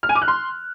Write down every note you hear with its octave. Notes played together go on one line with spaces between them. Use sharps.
F6
G#5
D6
F#6
C6